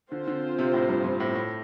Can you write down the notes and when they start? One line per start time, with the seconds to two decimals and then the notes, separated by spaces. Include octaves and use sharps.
0.12 D3 C4 F4 C5
0.27 D3
0.59 C3
0.74 A2
0.89 G2
1.04 G2
1.20 A2
1.35 A2